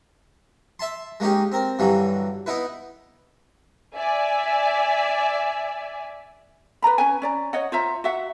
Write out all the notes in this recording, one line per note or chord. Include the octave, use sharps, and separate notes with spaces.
E5 A5 C6
G#3 A#3 C#4 D#4 G4
C4 A#4
G2 D3 E3 F#3
B3 D#4 E4 B4
D5 E5 G#5
B4 D5 A#5 B5
C#4 B4 G#5
C#4 D5 A#5
C#5 D#5 F#5
F4 C5 E5 A#5
F#4 E5 F#5